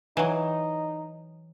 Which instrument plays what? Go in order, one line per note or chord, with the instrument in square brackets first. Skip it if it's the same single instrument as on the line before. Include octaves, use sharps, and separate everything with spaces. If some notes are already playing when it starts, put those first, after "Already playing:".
[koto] E3 F#3 [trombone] D#4